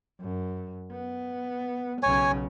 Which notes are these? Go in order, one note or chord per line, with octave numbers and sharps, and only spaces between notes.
F#2
B3
B1 C#3 C#5 G#5